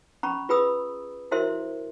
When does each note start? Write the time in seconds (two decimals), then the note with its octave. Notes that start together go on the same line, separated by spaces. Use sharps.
0.23 C#4 A#5 B5 C#6
0.49 F4 G#4 B4 B5 D#6 E6
1.31 E4 F#4 A#4 C5 E5 C6